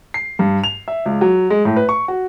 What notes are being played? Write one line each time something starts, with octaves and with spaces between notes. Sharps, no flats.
C7
G2
F7
E5
C#2
F#3
G#3
A2
B4
C#6
F#4